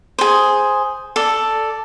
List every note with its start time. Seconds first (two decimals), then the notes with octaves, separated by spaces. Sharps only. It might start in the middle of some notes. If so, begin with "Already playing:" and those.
0.18 G#4 C5
1.16 A4 D5